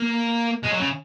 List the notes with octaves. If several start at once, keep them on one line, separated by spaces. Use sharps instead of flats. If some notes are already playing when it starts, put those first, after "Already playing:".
Already playing: A#3
G#3
F#3
C#3